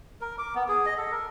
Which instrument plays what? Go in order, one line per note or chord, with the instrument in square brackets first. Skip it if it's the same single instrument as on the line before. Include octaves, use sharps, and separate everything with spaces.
[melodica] A#4
D6
B3
G#4
D#5
A4
A#4